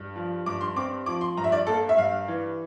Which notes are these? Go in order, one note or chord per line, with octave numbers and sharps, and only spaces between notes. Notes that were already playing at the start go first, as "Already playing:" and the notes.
Already playing: G2
F3
G2 D6
C6
C4 D6
F3 D6
C6
G2 A#5
E5
D5
A#3 A4
E5
G2 F5
E3